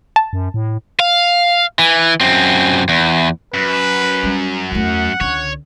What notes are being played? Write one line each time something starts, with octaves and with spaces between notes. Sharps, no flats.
A5
F#2
A2
F5
E3
F#2 C4
E2
F#2 B4
G3 C#4
E2 A3 F#5
C#2 D3 C#5